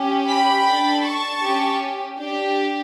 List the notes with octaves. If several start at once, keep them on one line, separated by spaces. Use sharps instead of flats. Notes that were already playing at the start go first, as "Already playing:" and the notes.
Already playing: C#4 G4
G5 B5
D4 A4
A5 C#6
C#4 G4
D4 G4